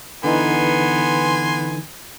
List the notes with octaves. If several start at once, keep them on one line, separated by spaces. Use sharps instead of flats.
D3 E3 B3 D#4 G#5 C6